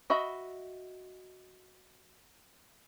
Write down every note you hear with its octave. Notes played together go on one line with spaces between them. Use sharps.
F#4 D#5 E5 B5